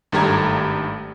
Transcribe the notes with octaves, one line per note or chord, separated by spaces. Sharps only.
G#1 G2 A3 G4 A#5 G#6